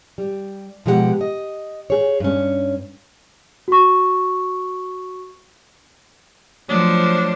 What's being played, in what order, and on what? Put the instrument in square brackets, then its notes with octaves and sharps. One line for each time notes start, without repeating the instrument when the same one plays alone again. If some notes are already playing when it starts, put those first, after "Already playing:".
[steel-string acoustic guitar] G3
B2 F3 G#3 G4 A#4 F#5
D#5
G#4 C#5
G2 C#4
[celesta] F#4 C#6
[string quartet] F3 [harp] F#3 A3 D#4 [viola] D4 C5